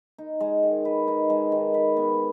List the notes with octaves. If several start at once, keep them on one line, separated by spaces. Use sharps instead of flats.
D#4
G#3
D#3
B4
D#4
G#3
D#3
B4
B3